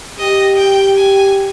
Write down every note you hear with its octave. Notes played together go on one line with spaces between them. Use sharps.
G4 D#5
G5
G#5